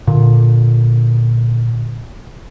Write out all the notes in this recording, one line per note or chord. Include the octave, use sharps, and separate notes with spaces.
A#2 D3